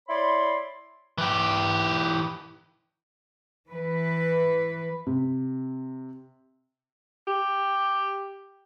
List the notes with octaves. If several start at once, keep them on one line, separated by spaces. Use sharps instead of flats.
E4 C#5 D5 B5 C6
E3 G4
E3 B4
C3
G4